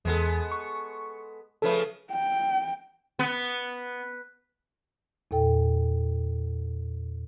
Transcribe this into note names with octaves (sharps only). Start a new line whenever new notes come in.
E2 G#3 B3 A4
C#6
C#3 F3 A3 A4 B4
G5
B3
E2 A#2 A4 G5